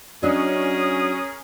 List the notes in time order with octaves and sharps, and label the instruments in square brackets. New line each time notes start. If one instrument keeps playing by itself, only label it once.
[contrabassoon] F#3 [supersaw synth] C#4 [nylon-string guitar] D4 D#5 [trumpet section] G#4 A#4 D#6